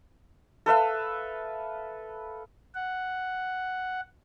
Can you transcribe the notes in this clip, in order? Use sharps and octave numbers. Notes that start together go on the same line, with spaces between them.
A4 B4 E5 F5
F#5